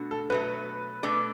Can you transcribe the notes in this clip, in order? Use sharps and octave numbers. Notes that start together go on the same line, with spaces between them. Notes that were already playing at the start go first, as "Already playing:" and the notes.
Already playing: B2 A3 D4 F#4
A4
B2 F#3 A3 B4
B2 A3 D4 A4 D5